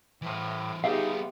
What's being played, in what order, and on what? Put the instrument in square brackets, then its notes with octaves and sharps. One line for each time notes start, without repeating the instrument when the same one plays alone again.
[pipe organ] A2 [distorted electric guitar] E3 C5
[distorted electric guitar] G3 B3 [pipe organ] D#4 [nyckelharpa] G4 [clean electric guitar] G#4 E5 F5